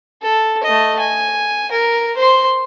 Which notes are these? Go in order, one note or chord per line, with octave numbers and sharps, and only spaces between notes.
A4
A3 D#5
G#5
A#4
C5 C6